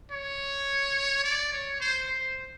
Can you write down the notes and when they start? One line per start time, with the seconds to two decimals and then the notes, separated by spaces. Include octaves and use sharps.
0.12 C#5
1.24 D5
1.52 C#5
1.80 C5
2.08 C5